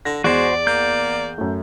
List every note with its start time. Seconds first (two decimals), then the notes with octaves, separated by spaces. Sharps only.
0.05 D3 A#6
0.24 E2 G#3 F#4 C5 D5
0.67 A#3 G6
1.38 F#2 A3